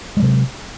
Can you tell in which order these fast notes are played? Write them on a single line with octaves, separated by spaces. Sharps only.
G#3 F#3 C3